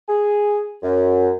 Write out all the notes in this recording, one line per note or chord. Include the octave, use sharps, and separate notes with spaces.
G#4
F#2